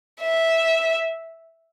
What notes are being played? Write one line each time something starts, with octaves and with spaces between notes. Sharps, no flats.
E5